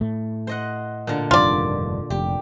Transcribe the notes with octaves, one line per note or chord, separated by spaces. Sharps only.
A2 A3
C5 D#5 F#5
A#2 D3
F1 G2 D#3 F4 D5
F1 G4